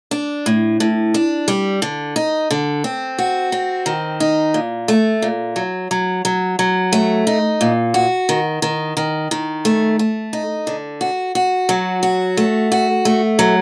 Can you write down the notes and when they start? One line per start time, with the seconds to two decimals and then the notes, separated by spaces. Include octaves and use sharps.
0.11 D4
0.46 A2
0.80 A2
1.14 D4
1.48 G3
1.82 D3
2.16 D#4
2.51 D3
2.84 C4
3.18 F#4
3.52 C4
3.86 D#3
4.20 D#4
4.54 A#2
4.88 A3
5.22 A#2
5.56 F#3
5.91 F#3
6.25 F#3
6.59 F#3
6.93 A3
7.27 D#4
7.61 A#2
7.94 F#4
8.29 D#3
8.62 D#3
8.97 D#3
9.31 D#3
9.65 A3
9.99 A3
10.33 D#4
10.67 D3
11.01 F#4
11.35 F#4
11.69 F#3
12.03 F#4
12.37 A3
12.72 F#4
13.05 A3
13.39 F#3